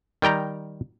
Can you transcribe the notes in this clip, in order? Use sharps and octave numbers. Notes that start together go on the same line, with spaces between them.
D#3 G3 G5 A#5